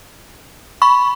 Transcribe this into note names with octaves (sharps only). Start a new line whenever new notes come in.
B5 C#6